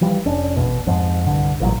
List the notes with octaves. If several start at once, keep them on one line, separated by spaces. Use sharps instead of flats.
E3 F3 G3
F1 C#4 D4
G#1 E2 B2
F2 G#2 F3
C2 G2 D3
A1 A#2 E3 F#3